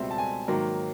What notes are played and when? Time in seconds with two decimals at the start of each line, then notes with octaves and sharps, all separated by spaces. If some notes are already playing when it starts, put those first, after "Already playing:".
Already playing: C#2 B2 G3 C4 E5
0.11 A5
0.18 G#5
0.48 G#2 D#3 F#3 A#3